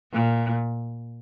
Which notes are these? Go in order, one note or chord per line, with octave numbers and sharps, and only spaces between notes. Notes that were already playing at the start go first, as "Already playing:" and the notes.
A#2